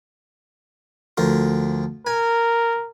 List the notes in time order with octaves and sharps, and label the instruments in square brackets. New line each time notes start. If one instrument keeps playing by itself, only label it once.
[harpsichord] D2 F3 A#4
[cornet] A#4 [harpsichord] G#5